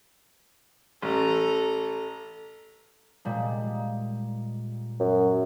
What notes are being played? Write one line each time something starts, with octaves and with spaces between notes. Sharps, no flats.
A1 A4 A#5
A#2 G3 G#3
F#2